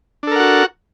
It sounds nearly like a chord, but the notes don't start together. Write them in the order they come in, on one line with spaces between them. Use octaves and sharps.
D4 A4 A#4 F#5 F#4